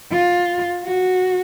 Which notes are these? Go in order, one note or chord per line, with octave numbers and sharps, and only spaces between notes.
F4
F#4